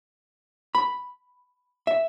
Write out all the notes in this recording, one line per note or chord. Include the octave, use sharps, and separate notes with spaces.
B5
E5